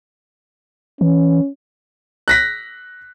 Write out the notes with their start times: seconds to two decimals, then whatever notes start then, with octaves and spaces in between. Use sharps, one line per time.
1.01 E3 C#4
2.28 F#6 A#6 B6